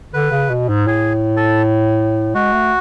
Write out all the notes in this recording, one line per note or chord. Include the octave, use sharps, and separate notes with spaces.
D3 B4
C#3
B2
G#2
A2 G#4
A4
G#3 F#4
A3